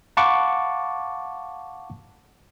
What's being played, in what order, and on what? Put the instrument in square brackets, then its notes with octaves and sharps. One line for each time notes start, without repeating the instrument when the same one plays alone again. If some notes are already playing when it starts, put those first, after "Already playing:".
[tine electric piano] F5 F#5 A5 B5 C#6 D6